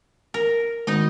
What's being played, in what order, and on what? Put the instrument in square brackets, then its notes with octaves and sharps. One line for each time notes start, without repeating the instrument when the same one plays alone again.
[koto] A#4
[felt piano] G#1 [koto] D#4 D#5